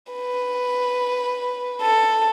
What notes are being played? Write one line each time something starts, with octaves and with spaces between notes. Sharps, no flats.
B4
A4